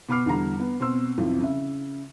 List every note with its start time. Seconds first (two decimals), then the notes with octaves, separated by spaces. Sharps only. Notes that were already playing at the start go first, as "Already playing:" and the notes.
0.09 B2 B3 B5 D6 F6 C7
0.26 E2 D3 G3 A#5
0.60 B3
0.80 B2 C4 C6 E6
1.18 B1 F2 C3 E3 F3
1.41 C#3 E5